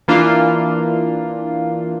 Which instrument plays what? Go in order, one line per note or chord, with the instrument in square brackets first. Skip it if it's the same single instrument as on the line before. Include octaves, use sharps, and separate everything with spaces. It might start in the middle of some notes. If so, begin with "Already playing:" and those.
[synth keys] E3 A#3 D4 F4